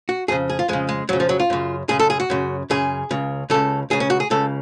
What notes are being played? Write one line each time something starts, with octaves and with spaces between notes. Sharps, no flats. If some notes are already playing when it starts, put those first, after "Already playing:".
F#4
F2 C#3 G#4
G#4
F4
F2 C#3 G#3
G#3
F2 C#3 F#3
F3
F#3
F4
F#2 C#3
F#2 C#3 G#4
A4
G#4
F#4
F#2 C#3
F#2 C#3 G#4
C#2 C#3
C#2 C#3 A4
C#2 C#3 G#4
C#4
F#4
G#4
C#2 C#3 A4